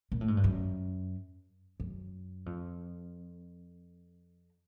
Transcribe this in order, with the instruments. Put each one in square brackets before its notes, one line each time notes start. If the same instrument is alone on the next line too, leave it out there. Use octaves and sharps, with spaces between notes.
[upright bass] A#2
A2
G#2
G2
F#2
F#2
F2